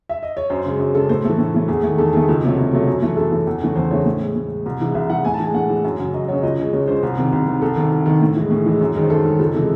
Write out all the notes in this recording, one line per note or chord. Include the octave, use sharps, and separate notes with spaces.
E5
D#5
C#5
F#2 C5
C#3 G#3
F#2
C#3 G#3 A4
A2 C5
E3 A3 A4
A2
E3 A3
E2 G#4
D#3 A3
E2 A4
D#3 A3 G#4
C#2
C3 F#3 A3
C#2
C3 F#3 A3
F#2
E3 A3
F#2 A4
E3 A3
E2
C#3 E3 A3
E2 C5
C#3 E3 A3 C#5
A2
G#3
A2
G#3
C2
C3 E3 G#3
C2 E5
C3 E3 G#3 F#5
A2 G#5
A5
E3 G#3 G#5
A2 F#5
E3 G#3
F#2
C#3 F#3
F#2 D#5
C#3 F#3 C#5
C#2 D#5
C#3 G#3
C#2 C#5
C#3 G#3 C5
C2 G#4
C3 D#3
C2
C3 D#3
C2 A4
C3 D#3
C2
C3 D#3
A2
E3 G#3
A2 G#4
E3 G#3
F#2
D#3 G#3
C5
F#2 A4
D#3 G#3
C#2 A4
C3 E3 G#3